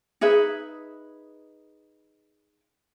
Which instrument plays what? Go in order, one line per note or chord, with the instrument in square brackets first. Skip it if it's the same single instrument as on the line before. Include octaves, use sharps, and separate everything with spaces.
[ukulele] D#4 G#4 B4 E5